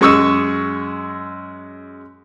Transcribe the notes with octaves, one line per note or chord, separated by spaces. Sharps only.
F#2 G#3 C#6 D#6 E6